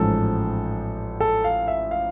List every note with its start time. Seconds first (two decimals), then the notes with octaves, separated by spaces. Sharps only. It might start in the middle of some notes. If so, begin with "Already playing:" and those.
Already playing: A1 G#2 F3 A4
1.20 A4
1.44 F5
1.68 E5
1.91 F5